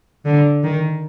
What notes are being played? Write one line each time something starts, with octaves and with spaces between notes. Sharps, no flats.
D3
D#3